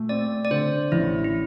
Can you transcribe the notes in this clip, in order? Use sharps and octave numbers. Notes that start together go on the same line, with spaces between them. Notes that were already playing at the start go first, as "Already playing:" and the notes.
Already playing: A#2 A3
C4 D5
D5
D3 C5
A1 E4
E4